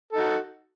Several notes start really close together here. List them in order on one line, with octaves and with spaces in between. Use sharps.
A4 D#4 F#4